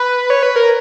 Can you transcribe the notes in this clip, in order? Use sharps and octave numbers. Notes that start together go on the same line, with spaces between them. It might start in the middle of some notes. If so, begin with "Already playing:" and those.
Already playing: B4
C#5
B4
A#4